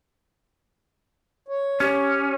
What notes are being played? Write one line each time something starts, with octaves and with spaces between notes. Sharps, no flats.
C#5
C#4 G4